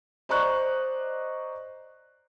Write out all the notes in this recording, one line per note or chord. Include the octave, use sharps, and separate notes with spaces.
C5 D5 D#5 A#5 C#6 F#6